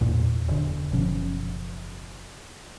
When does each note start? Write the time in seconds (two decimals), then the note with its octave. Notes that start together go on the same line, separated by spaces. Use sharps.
0.01 E2 A#2
0.48 E1 D3
0.91 F#1 B2 F3 C#4